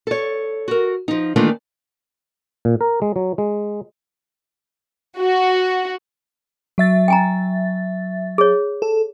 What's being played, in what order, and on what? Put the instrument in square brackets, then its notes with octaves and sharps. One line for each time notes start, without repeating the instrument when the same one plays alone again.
[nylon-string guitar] A4 C#5
F#4 A#4
F3 D#4
D#3 E3 A3 A#3 D4 F4
[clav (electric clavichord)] A#2
A#4
G#3
F#3
G#3
[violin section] F#4
[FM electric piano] F#3 E5 A6
[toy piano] G5 G#5 A#5
G#4 C#5
[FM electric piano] A4